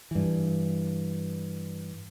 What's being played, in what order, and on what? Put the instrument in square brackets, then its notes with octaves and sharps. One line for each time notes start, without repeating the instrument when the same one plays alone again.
[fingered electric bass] G2 E3